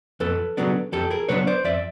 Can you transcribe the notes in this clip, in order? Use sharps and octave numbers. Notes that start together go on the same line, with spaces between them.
F2 A4 B4
C#3 F#3 B3 D4
F2 G4 A4
G#4 A#4
C#3 F#3 B3 D4 B4 C#5
C5 D5
F2 D5 E5